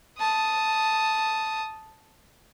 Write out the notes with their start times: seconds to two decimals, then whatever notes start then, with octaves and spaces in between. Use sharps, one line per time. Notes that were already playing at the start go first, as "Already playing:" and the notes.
0.18 A5 D#6